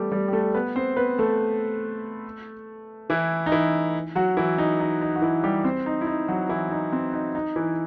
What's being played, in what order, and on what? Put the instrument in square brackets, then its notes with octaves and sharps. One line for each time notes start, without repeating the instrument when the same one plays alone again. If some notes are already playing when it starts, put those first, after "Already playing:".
Already playing: [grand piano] G3 A3 B3 G4 A4
G3 G4
G4
A3 A4
B3 B4
C4 C5
B3 B4
A3 A4
E3 E4
D#4
E3 E4
F#3 F#4
E3 E4
D#4
D#4
D#4
F#4
E3 E4
G3 G4
C4 C5
D#4
E4
D#4
F#3 F#4
E3 E4
D#4
C4
D#4
D#4
E3 E4